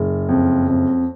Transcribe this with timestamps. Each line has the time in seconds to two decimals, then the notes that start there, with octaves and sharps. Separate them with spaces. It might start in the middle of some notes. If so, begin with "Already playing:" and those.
Already playing: F#1
0.29 F2
0.68 F2